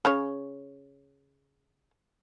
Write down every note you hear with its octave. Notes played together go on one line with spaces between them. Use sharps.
C#3 C#4 C#5